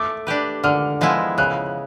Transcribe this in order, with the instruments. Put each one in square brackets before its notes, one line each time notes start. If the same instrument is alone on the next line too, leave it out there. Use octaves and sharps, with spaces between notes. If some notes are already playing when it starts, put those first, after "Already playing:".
Already playing: [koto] A3 [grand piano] D6
[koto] D4 G4 B4
[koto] D3 [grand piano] F6
[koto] F3 G#3 B3 E4
[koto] C#3 [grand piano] F#6